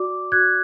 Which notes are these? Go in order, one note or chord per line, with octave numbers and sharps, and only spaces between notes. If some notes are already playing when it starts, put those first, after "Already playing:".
Already playing: F#4 D5 D6
F#4 F#6 G#6